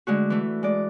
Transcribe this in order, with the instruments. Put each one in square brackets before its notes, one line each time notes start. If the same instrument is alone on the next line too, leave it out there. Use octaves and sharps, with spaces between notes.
[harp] D3 G#3 A3 F#4
E3 A3
G#3 D5